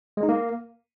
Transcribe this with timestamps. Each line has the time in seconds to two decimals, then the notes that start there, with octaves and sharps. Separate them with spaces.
0.17 G#3
0.23 D#4
0.29 A#3